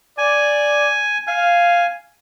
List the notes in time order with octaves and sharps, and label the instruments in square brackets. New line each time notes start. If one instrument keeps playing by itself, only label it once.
[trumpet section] D5 [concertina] G#5
[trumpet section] F5 [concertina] G#5